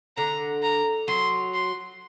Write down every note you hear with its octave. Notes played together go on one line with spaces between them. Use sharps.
D3 A#5
A#5
F#3 C6
C6